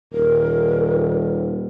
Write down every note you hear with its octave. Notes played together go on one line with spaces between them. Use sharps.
D#1 A#4